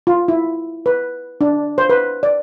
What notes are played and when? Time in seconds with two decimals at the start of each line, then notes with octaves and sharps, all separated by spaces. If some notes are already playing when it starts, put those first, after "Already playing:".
0.07 F4
0.28 E4
0.86 B4
1.41 D4
1.78 C5
1.89 B4
2.23 D5